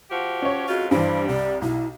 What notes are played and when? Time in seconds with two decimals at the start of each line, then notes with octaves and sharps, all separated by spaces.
0.10 F3 F#4 G4
0.42 C#4 C#5
0.68 F2 G#2 F4 F#4
0.91 G2 E3 G3 C5
1.28 C2 D5
1.62 B1 E4